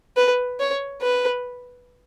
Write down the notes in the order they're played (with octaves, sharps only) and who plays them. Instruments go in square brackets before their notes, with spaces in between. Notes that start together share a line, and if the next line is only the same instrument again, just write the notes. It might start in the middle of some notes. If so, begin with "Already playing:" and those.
[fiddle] B4
C#5
B4